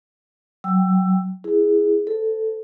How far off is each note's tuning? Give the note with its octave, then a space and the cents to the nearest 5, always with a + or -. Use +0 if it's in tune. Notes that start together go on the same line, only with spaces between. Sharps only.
F#3 +15 G5 +0 E6 +15
E4 +5 G#4 +0
A4 +0 C5 -25